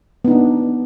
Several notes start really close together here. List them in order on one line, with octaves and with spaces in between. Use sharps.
B3 D#4 D4